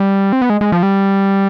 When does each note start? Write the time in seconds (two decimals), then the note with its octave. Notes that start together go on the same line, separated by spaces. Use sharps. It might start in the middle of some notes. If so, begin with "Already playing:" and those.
Already playing: G3
0.33 C4
0.42 B3
0.50 G#3
0.61 G#3
0.72 F3
0.83 G3